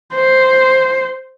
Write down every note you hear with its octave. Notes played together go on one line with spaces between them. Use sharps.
C5